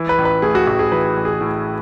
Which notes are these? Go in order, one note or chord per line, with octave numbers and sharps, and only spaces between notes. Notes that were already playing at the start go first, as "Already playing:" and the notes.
Already playing: E3
B4
A1
B4
A2 G#4
F#4
A1 F#4
G#4
E3 B4
A1
G#4
A2